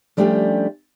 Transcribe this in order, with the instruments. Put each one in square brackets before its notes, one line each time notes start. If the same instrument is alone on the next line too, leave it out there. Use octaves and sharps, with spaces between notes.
[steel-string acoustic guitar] F3 G3 A3 C#4 D4 G4